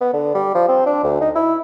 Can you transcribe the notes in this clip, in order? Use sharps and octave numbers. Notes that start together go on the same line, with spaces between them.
B3
D3
G3
F3
C4
D4
D2
D#4
E4